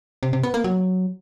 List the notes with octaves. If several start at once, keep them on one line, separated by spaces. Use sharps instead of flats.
C3
C3
B3
A#3
F#3